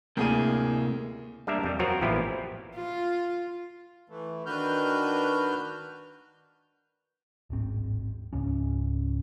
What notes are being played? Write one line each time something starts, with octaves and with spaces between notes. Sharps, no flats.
D2 A2 C3 A#3 G#4 D#7
G3 A#3 D4 G4 A#4 E5
F2 G3
F3 F#3 C4 F4 F#4 A#4
A1 A#2 F3 B3 E4 G4
F4
E3 A3
D#3 D4 F#4 B4 F6 G6
D1 G#1 C4
C#2 G#2 C#3 C#4